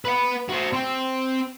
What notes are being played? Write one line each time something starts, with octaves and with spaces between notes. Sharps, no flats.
B4 F#5
F#4 C5
C4